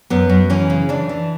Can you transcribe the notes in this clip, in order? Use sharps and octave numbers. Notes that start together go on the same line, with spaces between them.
F#2 B3
F#2
E3 C#4
C#3
E3 D4
E3